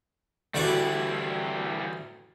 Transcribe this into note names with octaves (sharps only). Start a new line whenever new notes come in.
D2 E3 G3 F#4 D5